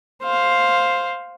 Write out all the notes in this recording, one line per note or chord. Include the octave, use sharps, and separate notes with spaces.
C5 F5